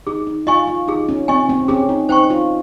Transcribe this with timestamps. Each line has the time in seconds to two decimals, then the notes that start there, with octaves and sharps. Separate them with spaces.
0.07 D#4 G#4
0.27 D#4
0.47 F4 D#5 G#5 C#6
0.67 F4
0.88 D#4 G#4
1.09 C#4
1.28 C4 D#5 G#5 C#6
1.49 C4
1.68 C#4 G#4
1.89 D#4
2.09 D#4 C5 G5 C#6
2.30 F4